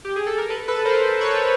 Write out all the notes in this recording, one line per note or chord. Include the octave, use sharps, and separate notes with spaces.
G4
G#4
A4
A#4
A4 B4
A4 B4
A#4 C5
B4 C#5